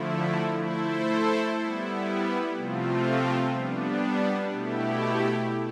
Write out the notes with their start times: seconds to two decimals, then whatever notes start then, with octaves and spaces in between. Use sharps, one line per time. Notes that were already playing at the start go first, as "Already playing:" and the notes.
Already playing: D3 F3 A3 E4
0.62 A3 E4 A4 C5
1.58 G3 B3 E4
2.56 C3 F3 A3 C4 F4
3.53 G3 B3 D4
4.50 B2 A3 E4 G4